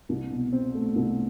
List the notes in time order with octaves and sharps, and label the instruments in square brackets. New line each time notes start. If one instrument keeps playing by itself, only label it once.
[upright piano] C2
B2
C4
A3
C2